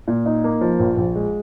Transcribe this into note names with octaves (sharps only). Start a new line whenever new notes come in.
A#2
D#4
A#3
F3
A#1
A#1
G#3